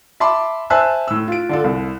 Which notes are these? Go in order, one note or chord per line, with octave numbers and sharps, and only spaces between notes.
E5 A5 B5 C6 D6
C5 E5 G#5 A5 E6 F#6
A2 E6
F4 D7
D3 F4 A4
C2